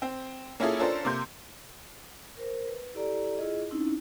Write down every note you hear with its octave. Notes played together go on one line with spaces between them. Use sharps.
C4
A#3 C#4 E4 F4 G#4 A4
C#4 D4 F4 A4 A#4 C5
C3 A#3 C6 G6
A#4 C5
B4
E4 G4 A4 D5 A#5
E4 F4 G#4 D#5
C4 C#4 D#4 E4